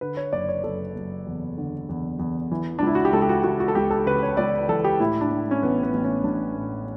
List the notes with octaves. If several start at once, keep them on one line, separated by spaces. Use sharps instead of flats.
D3 B4
C#5
F#1 D5
C#5
F#1 A4
F#1
E2
D3
E2
E2
E3
D4
C#2 E4
F#4
G4
C#2 A4
G4
F#4
C#2 F#4
F#4
A4
C#2 G4
A4
C#3 B4
C#5
C#2 D5
E3 A4
G4
A2 E4
D4
A2
C#4
A1 B3
B3
A1
C#4
A1 D4
A2